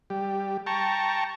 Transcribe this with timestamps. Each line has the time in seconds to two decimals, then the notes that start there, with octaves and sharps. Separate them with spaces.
0.10 G3 G4
0.66 G5 A5 A#5 C#6